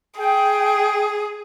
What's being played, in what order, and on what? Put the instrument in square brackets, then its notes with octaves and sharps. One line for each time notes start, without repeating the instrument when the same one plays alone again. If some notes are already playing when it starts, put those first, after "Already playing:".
[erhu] G#4 [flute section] G5